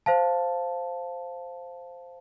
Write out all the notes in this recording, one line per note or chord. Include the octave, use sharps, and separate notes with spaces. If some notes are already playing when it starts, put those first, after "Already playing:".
C5 F5 A5